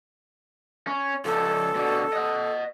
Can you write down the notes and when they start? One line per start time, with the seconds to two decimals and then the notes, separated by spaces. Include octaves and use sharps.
0.87 C#4
1.25 C#2 F3 A4
1.76 B2 D3
2.13 D#5 F#5